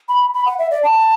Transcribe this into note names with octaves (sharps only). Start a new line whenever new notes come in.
B5
B5
F#5
E5
D5
A5